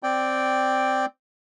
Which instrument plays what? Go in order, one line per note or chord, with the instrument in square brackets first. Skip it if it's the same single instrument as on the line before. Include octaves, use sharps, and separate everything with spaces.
[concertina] C4 D5 G5